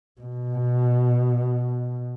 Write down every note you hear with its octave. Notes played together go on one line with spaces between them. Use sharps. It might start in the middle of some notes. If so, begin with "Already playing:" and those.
B2